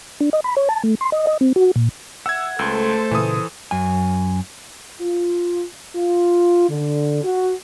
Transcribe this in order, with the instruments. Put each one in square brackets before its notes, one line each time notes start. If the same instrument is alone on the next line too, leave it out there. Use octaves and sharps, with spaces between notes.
[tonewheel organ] D4
D#5
B5
C#5
A5
A3
C6
D#5
D#5
C4
F#4
A#2
[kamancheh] E5 [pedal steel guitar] F#5 [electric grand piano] E6 G#6
[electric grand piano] C#2 [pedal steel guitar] A3 C6 E6 [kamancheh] A4 C5
[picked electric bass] A#2 C#3 [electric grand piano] E3 D#6
[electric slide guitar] F#2 G#5
[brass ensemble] F4
F4
D3
F#4